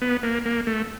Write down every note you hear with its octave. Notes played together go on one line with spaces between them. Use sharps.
B3
A#3
A#3
A3